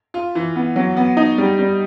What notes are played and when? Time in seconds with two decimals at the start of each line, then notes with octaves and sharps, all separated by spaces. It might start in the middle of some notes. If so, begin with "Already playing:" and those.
0.14 F4
0.35 E3
0.56 B3
0.76 F#3
0.97 B3
1.17 D#4
1.38 G3
1.59 G3